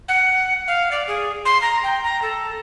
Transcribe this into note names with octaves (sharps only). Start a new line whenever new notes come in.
F#5
F5
D5
G#4
C6
A#5
G5
A#5
A4